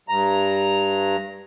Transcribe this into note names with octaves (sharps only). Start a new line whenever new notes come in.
G2 A#5